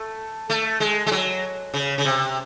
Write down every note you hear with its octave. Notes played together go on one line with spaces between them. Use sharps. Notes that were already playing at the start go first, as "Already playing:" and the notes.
Already playing: A3
A3
G#3
G#3
F#3
C#3
C#3
C3